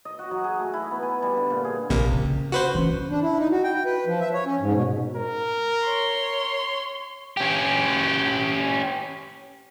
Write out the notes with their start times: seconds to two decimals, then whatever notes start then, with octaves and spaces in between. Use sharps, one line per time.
0.05 D#5
0.19 F#4
0.31 F#3
0.44 G#4
0.59 A3
0.74 E4
0.91 B3
1.03 G#5
1.22 G3
1.37 D3
1.50 A#2
1.64 G#4
1.90 A#1 C3 A#3
2.12 C#3
2.52 F#4 B4 C5
2.75 E3 C#4
3.11 D4
3.22 E4
3.39 D#4
3.51 F#4
3.64 G5
3.85 B4
4.07 F3
4.20 E5
4.33 C#5
4.46 C#4
4.60 G#2
4.74 B2
5.16 A#4
5.84 C#5 C6
7.37 C#4 G4